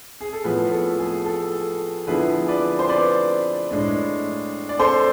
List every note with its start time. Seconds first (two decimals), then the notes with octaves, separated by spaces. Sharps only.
0.21 G#4
0.33 A4
0.44 A2 F3 B3 G#4 B4
0.72 A4
0.99 G#4
1.26 A4
2.07 D3 F3 B3 E4 G#4 B4
2.48 B4 D5
2.79 C5
2.89 B4 D5
3.71 A2 G#3 D4
4.69 D5
4.79 A4 C5